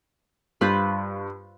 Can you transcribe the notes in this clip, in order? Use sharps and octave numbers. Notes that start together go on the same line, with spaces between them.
G2 F4 B4 C5